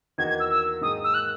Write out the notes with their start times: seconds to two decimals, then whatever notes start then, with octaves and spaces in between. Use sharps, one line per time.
0.18 E2 D#3 A#3 D#4 F#4 G#6
0.29 G#6
0.40 E6
0.51 E6
0.81 G#2 D#3 A#3 D#4 G#4 D#6
1.04 E6
1.14 F#6